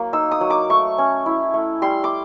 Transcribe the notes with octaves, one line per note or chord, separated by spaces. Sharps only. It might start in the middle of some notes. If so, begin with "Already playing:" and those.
Already playing: F#3 A#3
D#4 E6
D#6
F#3
D6
A3 C#6
C#4
E4
A3
G3 C6
D6